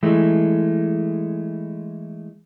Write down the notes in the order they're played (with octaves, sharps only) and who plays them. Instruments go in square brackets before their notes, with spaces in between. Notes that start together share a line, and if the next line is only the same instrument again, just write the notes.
[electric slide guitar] E3 G#3 A3